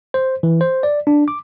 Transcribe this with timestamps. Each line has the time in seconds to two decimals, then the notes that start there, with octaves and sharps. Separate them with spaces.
0.14 C5
0.43 E3
0.61 C5
0.83 D5
1.07 D4
1.28 D6